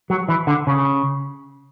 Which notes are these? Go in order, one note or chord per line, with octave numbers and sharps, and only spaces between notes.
F#3
E3
D3
C#3